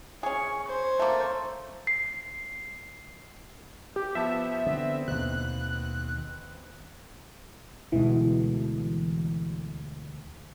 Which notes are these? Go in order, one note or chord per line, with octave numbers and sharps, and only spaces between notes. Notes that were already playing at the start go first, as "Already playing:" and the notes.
C#4 G#4 C#6
C5 G#6
A3 A#3
C7
G4
F3 B3 E5 A5
D3 B3 C4
D#2 B2 F#6
D2 B2 E3 G#3